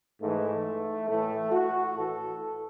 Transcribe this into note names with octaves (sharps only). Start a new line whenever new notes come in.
G#2 E3 A3
A2 E3 A3
F#4
A2 E3 A4